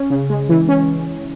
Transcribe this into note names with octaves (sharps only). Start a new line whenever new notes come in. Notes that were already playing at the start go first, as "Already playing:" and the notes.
Already playing: C#4
C#3
G#3
E3
C#4